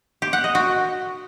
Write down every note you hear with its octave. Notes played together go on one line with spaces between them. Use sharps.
G4
F#5
D#5
F#4